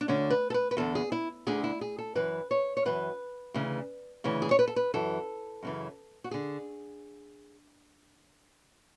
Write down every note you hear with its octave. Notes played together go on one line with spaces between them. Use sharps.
D4
D2 D3 C#4
B4
A4
B4
B4
E2 D3 A4
G#4
E4
D2 D3 G#4
E4
G#4
A4
F#2 E3 B4
C#5
C#5
F#2 E3 B4
D2 C#3 E3
D2 C#3 E3
G#4
C#5
B4
A4
B4
F#2 E3 A4
F#2 C#3 E3
F#4
D3 G#4